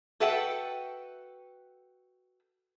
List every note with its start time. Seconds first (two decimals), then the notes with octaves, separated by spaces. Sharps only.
0.20 F#4 A4 B4 E5 F#5 G5